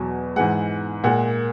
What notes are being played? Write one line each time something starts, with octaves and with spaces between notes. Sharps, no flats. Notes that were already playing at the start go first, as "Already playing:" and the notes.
Already playing: E2 B2 F#3
G#2 E3 G#3 F#5
A#2 G#3 F#5